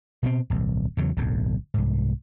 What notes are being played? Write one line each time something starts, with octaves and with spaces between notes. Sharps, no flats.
B2 B3 C4
D1 B1
E2 C#3 F#3
D1 B1 F#2 D3
C2 G#2